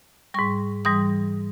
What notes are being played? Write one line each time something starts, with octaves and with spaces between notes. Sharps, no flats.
G#2 G3 C#6
G#2 E3 G3 D#6